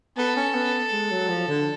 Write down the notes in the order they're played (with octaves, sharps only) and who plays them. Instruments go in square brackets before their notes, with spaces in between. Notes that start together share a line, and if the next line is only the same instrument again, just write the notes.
[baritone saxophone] B3 [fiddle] A4
[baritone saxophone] C#4
B3
G#3
F#3
F3
D3